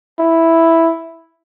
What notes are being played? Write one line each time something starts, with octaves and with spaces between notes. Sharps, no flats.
E4